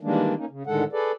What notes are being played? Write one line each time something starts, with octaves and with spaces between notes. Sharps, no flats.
D#3 E3 G3 G#3 A#3 D4
A#3 C#4 D#4
C#3
A2 D3 D#3 G#3 A4 F#5
G#4 A4 B4 D5